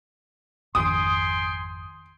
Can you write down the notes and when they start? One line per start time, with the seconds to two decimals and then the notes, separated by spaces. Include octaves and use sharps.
0.75 G#1 F2 D#3 G5 G#5 C6 D#6